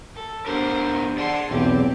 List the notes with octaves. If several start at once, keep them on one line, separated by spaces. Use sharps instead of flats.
A4
B3 D4 G4 A#4 C5
G#4 D5 F#5 A5 C6
B1 E2 C4 G4